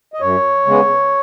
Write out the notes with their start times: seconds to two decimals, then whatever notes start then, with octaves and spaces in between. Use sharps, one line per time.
0.14 D#5
0.21 F#2 C#5
0.66 C#3 G#3 B3